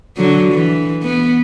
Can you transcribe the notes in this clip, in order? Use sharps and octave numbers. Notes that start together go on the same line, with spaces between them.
D3 F#3
E3
B3